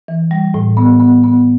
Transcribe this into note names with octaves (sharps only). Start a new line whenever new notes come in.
E3
G3
A2
B3
B3
B3